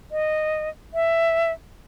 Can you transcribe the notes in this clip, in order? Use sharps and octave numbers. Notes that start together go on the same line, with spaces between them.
D#5
E5